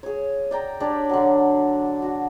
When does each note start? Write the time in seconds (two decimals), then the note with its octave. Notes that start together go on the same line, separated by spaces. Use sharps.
0.03 G#4 C#5
0.51 D5 G5 A#5
0.80 D4 G4 C#5 D5
1.09 D3 F#3
2.02 F#4